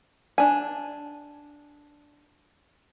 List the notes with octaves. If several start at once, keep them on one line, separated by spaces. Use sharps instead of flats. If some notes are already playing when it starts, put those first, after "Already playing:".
D4 G#5